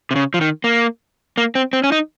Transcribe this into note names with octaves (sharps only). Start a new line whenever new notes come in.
C3
C#3
F3
D#3
A#3
A#3
C4
C4
C#4
D#4